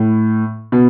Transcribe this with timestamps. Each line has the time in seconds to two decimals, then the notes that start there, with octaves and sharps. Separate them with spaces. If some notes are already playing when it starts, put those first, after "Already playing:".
Already playing: A2
0.72 B2